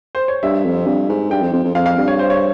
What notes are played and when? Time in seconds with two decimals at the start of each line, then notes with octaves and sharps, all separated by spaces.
0.15 C5
0.28 C#5
0.43 G2 E5
0.65 F2
0.86 G2
1.09 G#2
1.31 G2 G5
1.42 F2
1.53 F2
1.64 F2
1.75 F2 F5
1.86 F5
1.97 G2
2.08 C#5
2.19 C5
2.30 C#5